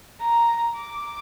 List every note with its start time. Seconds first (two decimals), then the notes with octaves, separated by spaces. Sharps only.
0.20 A#5
0.76 D6